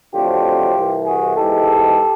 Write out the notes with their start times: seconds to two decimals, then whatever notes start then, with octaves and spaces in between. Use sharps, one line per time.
0.13 F2 D3 F#3 A3 C4 F4 G4
0.75 C2 C3 E3
1.05 F#4 G#4
1.36 G#2 E3 G#3 B3 G4 A4